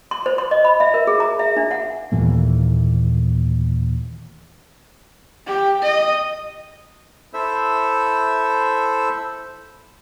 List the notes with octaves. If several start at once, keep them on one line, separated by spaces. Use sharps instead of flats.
C6
C5
C6
D#5
B5
E5
A#4
G#4
A#5
E5
D4
F#5
D#2 A#2 E3 A3
G4
D#5
E4 A4 C5 E5 E6